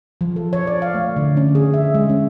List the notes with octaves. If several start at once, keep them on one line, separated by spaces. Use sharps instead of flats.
F3
A4
C#5
D5
F5
A3
D3
C#4
G#4
E5
G#3
C#4